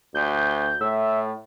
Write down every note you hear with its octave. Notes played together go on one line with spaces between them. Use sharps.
D2 G6
A2 E5